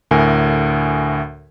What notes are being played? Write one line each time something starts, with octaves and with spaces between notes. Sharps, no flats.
D2 A2 A#4 G#5